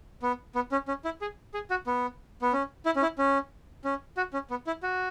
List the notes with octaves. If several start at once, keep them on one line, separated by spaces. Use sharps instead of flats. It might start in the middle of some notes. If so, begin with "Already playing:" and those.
B3
B3
C#4
C#4
E4
G#4
G#4
F#4
B3
B3
C#4
E4
C#4
E4
C#4
C#4
F#4
C#4
B3
E4
F#4